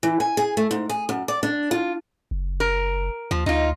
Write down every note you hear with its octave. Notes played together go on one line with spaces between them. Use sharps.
E3
G#5
G#4
A3
G#2
G#4
F#2
D5
D4
F4
F#1
A#4
D#2 F3
D2 D#4 F4